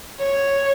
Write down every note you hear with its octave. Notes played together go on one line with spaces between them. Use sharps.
C#5